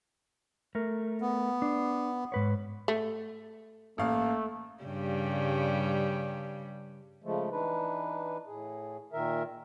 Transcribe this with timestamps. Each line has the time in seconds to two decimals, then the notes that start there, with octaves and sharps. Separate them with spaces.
0.75 A3 A#4
1.21 B3
1.62 D4
2.32 G#2 B4 C#5
2.88 A3
3.98 A1 A3 A#3 F5 F6
4.84 G2 C#3 G3
7.24 C#3 F3 G#3 A3
7.51 E3 D4 D#4 B4
8.47 A2 G#4
9.13 A#2 D#3 A#4 E5